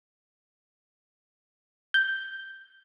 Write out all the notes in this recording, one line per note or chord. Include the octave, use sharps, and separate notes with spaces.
G6